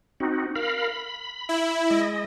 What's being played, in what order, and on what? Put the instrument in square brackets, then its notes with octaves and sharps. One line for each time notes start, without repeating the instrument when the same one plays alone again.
[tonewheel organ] C4 D#4 F#4
A#4 F5 B5
B5
[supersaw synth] E4
[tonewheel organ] G#3 D#5